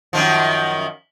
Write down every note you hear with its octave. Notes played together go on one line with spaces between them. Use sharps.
F#2 D#3 F3